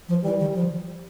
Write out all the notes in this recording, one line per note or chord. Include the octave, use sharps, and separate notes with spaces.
F3
E3 G3
D#3
F3